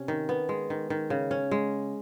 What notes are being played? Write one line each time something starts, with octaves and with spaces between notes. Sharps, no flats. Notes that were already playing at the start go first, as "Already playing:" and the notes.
Already playing: C3 C#4
D#3
B3
G#3
D#3
D#3
C#3
C#4
G#3